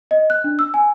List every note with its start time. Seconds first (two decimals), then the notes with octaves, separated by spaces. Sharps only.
0.11 D#5
0.30 F#6
0.44 D4
0.59 E6
0.74 G#5